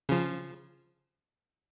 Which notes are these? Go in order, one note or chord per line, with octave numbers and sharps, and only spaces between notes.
C#3 F3